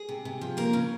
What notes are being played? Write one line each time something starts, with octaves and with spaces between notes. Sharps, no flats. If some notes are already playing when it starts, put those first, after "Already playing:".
Already playing: G#4
C3
C3
F3
A#3 A#4
C#3 C#4